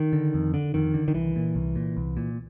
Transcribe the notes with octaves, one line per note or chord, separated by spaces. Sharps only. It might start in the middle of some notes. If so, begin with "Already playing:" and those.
Already playing: D#3
D3
F2
D3
F2 D#3
D3
D#3
C2 E3
A#2
C2
A#2
C2
A#2